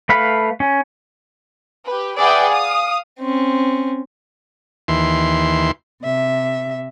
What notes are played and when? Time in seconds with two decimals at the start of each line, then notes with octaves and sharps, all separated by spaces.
0.09 A3 B4 F5 B5
0.60 C#4
1.86 G4 B4
2.17 G#4 B4 D5 E5 F#5 G5
2.50 F5 D#6
3.20 C4 C#4
4.88 D#2 E3 C6
6.03 C3 E5